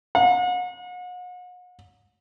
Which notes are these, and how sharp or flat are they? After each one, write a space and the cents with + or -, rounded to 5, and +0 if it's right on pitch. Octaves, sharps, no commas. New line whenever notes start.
F#5 -40